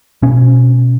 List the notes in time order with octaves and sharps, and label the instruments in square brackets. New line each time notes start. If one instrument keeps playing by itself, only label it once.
[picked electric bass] B2 C#4